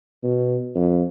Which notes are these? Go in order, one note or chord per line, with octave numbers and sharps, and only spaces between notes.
B2
F2